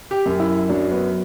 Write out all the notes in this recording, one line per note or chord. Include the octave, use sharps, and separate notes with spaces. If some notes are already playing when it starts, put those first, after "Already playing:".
G4
F#2
E4
F#3 D4
B3